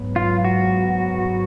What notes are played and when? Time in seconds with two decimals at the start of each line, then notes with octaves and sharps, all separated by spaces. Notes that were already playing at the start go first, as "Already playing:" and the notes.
Already playing: G#2 F#3 B3
0.16 F4
0.45 F#4